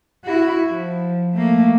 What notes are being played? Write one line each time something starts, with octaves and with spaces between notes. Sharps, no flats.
E4 F#4
F3
A3 A#3